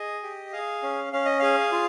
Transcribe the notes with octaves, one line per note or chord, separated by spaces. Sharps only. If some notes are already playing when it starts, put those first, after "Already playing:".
Already playing: G#4 D#5
G4
G#4 F5
C#4
C#4 F5
D#5
G#4 F5
F4